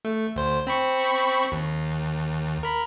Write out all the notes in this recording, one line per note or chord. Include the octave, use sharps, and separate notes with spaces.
A3
D2 C5
C4 B5 C#6
D#2
A#4 B5